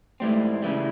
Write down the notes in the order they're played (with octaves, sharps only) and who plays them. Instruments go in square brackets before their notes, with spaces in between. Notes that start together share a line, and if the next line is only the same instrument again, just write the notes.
[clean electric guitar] G#2 E3 G3 C4 [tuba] A3
[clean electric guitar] C#3 E3 G3